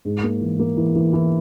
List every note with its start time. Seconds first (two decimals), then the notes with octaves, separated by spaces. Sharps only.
0.05 G#2
0.23 A#3
0.41 E3
0.59 A#3
0.77 E3
0.95 E3
1.13 E3